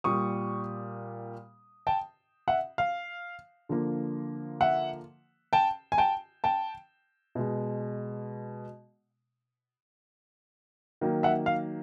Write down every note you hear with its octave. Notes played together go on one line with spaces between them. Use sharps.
A#2 G3 A#3 C#6 D#6
G5 A5
E5 F#5
F5
D3 F3 A#3
E5 F#5
G5 A5
G#5
G5 A5
G5 A5
B2 G#3
D#3 F#3 A#3
E5 F#5
F5